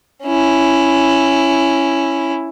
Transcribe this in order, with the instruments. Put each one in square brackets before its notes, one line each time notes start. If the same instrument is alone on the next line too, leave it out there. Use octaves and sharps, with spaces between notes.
[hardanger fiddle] C#4 E4